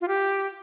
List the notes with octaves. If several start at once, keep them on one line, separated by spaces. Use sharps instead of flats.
F4
G4